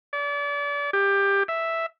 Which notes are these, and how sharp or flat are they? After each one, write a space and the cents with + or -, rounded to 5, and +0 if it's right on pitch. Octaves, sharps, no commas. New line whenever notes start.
D5 -35
G4 +20
E5 +0